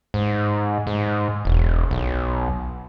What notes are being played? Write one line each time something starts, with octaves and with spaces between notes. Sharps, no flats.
G#2
G#2
E1
B1